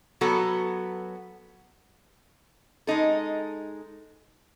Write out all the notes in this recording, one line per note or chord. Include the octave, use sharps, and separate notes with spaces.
F#3 B3 F#4 A4
G#3 D#4 A4